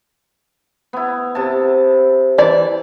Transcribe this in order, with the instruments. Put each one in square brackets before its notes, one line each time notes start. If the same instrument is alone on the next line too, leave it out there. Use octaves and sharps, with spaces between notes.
[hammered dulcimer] B3 E4
C3 A5
[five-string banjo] E3 D5